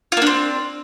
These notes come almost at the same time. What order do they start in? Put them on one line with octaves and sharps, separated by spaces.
F4 A#3 D4 C4